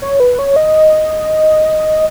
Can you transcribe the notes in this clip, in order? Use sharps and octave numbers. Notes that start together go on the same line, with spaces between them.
C#5
B4
C#5
D#5